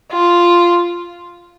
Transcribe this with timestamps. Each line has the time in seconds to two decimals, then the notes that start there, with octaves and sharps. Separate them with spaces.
0.12 F4